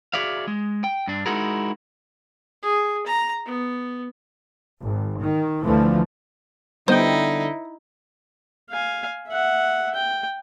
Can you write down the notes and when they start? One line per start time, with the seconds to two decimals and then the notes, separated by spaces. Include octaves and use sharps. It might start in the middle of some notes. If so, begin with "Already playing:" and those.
0.14 F#4 G#4 D5 E5 F5
0.48 G#3
0.84 G5
1.07 G2 D4
1.26 G#3 D#4 E4 F#4 G#4 A#4
2.63 G#4
3.06 A#5
3.46 B3
4.82 G#1
5.20 D#3
5.64 D2 D3 E3 F3 A3
6.88 D3 G3 B3 D#4 E4 C5 D#5 G5
8.71 F5 G#5
9.28 E5 F#5
9.94 G5